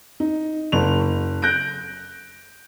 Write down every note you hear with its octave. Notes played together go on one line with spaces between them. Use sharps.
D#4
F#1 F7
F#6 G6 A#6 D7